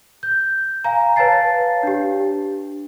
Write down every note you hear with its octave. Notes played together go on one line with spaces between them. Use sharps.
G6
F5 G#5 A#5
B4 C#5 F5 A5 A6 C7
D4 G4